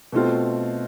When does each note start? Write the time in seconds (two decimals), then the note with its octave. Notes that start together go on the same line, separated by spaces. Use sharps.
0.12 B2 A3 C4 F4